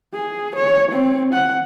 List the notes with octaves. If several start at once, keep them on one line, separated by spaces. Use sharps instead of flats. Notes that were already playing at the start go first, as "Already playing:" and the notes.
G#4
C#5
C4
F#5